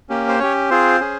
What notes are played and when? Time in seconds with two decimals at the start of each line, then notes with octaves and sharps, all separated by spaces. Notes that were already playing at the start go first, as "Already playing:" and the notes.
0.09 A#3 C#4 G4
0.28 C5
0.39 C#4 G4 C#5
0.70 C4 F4 G#4 C5
1.00 C#4 G#4